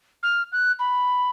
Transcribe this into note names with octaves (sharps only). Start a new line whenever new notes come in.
F6
F#6
B5